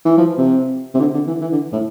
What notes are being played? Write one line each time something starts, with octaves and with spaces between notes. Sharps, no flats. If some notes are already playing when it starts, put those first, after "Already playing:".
E3
F3
C3
C3
D3
D3
E3
E3
D3
A2